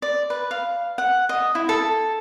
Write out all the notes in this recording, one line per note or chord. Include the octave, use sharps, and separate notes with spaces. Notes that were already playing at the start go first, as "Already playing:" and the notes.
D5
B4
F5
F#5
D#5
E4
A4